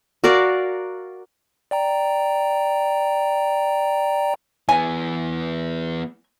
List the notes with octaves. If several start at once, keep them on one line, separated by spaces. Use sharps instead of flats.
F#4 A#4 D5 F5
D5 G5 A#5
E3 B3 G#5